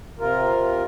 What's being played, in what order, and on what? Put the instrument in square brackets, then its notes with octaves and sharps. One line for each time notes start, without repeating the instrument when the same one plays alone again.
[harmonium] C3 F4 A#4